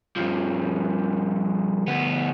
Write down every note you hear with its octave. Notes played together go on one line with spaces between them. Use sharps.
G2 F3
D2 B3